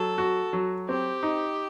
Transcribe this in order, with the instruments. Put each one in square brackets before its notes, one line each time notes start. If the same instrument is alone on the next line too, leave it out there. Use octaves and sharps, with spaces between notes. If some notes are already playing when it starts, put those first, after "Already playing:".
Already playing: [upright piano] F#3 [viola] A4
[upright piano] F#4
F#3
[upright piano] C4 [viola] G4
[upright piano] D#4